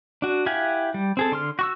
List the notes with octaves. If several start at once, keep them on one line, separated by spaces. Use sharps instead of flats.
D4 F#4
E4 G4 F5 F#5 G#5
G3
C4 G#4 A4
D3 C6 F6
F#4 C#6 E6